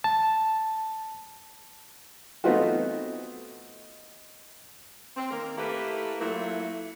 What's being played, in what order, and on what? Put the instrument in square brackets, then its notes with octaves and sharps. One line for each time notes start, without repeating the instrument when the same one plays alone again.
[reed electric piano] A5
[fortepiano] A3 B3 C4 D#4 F4 F#4
[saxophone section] C4
D#3 A#3 A#4
A3 A#3 E4 G4 B4
F#3 A3 A#3 E4 F4